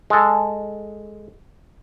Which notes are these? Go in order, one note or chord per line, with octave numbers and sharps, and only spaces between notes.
G#3 A4